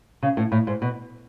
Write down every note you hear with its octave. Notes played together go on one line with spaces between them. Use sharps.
C#3
A2
A2
G#2
B2